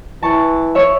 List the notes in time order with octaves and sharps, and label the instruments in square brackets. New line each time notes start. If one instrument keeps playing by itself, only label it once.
[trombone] E3 [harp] A5 C#6
[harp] C#5 E5